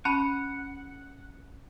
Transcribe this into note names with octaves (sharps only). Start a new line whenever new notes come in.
C#4 F#5 A5 B5